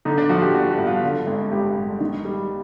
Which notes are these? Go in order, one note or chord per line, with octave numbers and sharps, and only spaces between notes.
D3 D#4
D4
F3 F#4
G4
G1 F#4
F#4
G2
F4
D3
G#1
G#1 G4
G2
D#3
G3